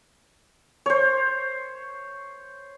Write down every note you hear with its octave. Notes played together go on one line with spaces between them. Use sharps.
C5 C#5